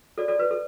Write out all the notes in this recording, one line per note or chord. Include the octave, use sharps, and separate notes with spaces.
A4 D5
A4 D5
B4
A4